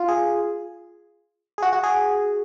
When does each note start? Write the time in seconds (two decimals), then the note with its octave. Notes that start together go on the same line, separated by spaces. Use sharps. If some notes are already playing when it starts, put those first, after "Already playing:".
Already playing: F4
0.08 G#4
1.58 G#4
1.63 F#4
1.73 F#4
1.83 G#4